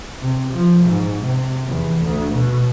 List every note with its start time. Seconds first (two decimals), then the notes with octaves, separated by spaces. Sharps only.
0.21 C3
0.54 F3
0.83 G#2
1.22 C3
1.66 E2
2.02 D2
2.34 B2